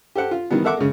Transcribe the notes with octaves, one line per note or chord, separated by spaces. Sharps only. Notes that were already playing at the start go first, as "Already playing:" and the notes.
G4 A4 C5 F#5
F4
D#3 E3 G3 B3
A4 A#4 E5 F#5 D6
C#3 G#3